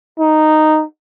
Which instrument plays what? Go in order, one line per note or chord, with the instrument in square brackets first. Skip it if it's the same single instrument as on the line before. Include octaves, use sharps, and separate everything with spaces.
[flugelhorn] D#4